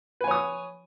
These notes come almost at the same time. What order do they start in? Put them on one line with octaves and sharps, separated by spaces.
B4 G#5 C#5 D#6